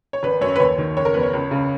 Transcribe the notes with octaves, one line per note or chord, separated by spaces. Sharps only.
C#5
G#1 B4
F#2 C#5
B4
D#2 C#5
D#3
F#1 C#5
A#4
E2 B4
C#5
C#2
C#3